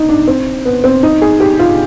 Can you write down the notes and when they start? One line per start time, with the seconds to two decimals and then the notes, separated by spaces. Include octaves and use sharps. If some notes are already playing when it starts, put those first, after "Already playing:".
Already playing: D#4
0.09 D4
0.27 C4
0.65 B3
0.84 C4
1.03 D#4
1.22 G#4
1.40 G4
1.59 F4